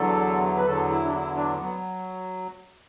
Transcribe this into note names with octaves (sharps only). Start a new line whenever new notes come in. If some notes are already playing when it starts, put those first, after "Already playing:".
Already playing: E2 D3 F#3 A4
B4
E2 D3 F#3 A4
E4
D4
E4
D4
F#3 B3